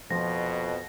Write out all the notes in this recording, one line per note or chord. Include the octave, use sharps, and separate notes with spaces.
F2 B2 F3 A#6